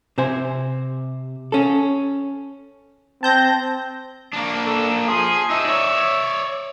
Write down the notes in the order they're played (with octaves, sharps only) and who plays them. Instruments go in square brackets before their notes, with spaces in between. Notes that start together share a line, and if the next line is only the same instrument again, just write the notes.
[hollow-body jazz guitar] C3 C5 G#5
C#4 A4
[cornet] C4 [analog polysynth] A5 G6 A#6
[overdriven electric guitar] A#3 D4
[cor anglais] A4
[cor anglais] F3 [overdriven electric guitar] G#4
[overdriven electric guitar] D#4 C5 [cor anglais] E5
[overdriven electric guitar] C#5 D5